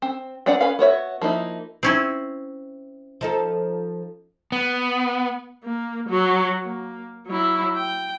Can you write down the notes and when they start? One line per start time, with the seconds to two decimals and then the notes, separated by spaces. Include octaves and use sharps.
0.02 C4
0.46 B3 C4 D4 D5 F#5
0.61 C#4 B4 F5
0.79 B3 F#4 C#5 E5
1.21 F3 A#3 D#4 E4
1.83 C4 C#4 E4
3.21 F3 D#4 A4
4.52 B3
5.64 A#3
6.09 F#3 F#4
6.64 A#3
7.27 F#3 E4
7.76 G5